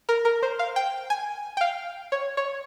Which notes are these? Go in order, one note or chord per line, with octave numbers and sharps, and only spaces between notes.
A#4
A#4
C5
F5
G5
G#5
G5
F5
C#5
C#5